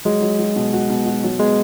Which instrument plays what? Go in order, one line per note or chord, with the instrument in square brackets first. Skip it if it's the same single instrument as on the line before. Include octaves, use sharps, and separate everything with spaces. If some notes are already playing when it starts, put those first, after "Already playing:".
[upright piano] F#3 [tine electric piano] G#3
[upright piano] F#3
F#3
B2
F#4
B2
F#4
F#3
[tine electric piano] G#3 [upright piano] B3